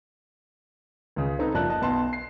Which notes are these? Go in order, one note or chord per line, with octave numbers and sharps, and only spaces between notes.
C#2 C#3 G#4
C4 D#4 A4 B4
F#1 F3 D5 A5 F#6
D#5 A5
B1 B3 A5 C6
C7